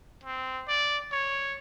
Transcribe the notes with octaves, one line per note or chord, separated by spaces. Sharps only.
C4
D5
C#5